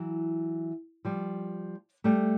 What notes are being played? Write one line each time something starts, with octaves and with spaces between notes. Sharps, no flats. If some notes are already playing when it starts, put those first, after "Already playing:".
Already playing: E3 F#3
F3 G3
G3 A3